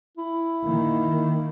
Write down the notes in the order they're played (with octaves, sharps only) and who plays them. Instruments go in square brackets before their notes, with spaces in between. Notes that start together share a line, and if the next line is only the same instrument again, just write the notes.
[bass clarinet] E4
[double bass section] D#3 A#3